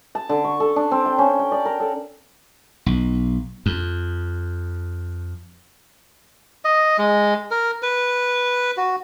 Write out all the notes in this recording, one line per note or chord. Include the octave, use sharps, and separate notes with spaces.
A5
D3
C#6
A4
D4
C4
G5
C#4
G5
D5
A#4
A4
B1
F2
D#5
G#3
A#4
B4
F#4